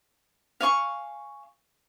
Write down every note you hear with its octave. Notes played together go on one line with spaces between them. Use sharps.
F5 G#5 C#6